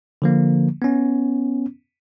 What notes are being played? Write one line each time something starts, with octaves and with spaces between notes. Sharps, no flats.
D3 F3 A#3
B3 C#4